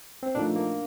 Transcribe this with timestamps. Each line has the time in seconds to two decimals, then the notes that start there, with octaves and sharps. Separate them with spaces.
0.23 C4
0.35 A#2 F3 A3 D4 D#4
0.56 A#3